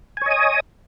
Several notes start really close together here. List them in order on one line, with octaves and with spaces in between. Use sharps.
G#5 C#5 D#5 D#6